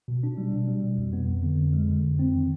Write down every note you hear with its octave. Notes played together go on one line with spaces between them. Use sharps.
B2
D4
G3
B2
G3
B2
F2
B3
F2
D3
F2
G#3
D3
F2
C4
D#3